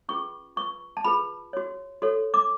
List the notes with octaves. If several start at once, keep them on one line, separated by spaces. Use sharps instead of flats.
C#4 F4 G#4 B4 C#6
F4 B4 C#6
A5
F4 G#4 B4 B5
F#4 C#5
F#4 A4 C#5
D6